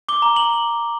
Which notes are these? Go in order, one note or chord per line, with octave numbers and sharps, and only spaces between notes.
D6 G7
A#5
F#7